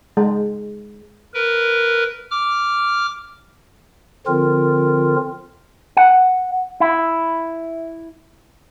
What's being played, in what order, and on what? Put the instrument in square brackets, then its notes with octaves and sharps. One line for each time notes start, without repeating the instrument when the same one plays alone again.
[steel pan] G#3
[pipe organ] A#4 B4
D6 F6
D3 F3 C4 F4 A#4
[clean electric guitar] F#5
E4